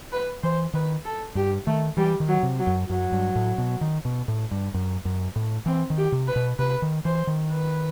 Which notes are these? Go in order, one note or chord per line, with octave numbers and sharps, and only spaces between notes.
B4
E3 C5
D#3 B4
A4
G2 G4
D#3 A3
E3 G3
D#3
F#3
C3
F#3
F#2
F#2 F#3
G2
A2
B2
D#3
B2
A2
G2
F#2
F#2
A2
E3 C4
D#3
G4
C3
B4
B2
C3 B4
D#3
E3 C5
D#3
B4